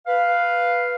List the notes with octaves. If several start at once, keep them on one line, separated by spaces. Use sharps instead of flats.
B4 F5